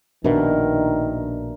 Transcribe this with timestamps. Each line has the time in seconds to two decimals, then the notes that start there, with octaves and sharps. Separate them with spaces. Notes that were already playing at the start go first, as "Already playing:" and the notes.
0.24 A#1 B2 D#3 D4 A#4 E5